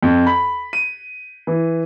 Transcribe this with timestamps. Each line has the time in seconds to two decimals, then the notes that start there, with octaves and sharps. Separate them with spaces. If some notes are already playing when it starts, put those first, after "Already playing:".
0.03 F2
0.26 B5
0.73 D#7
1.47 E3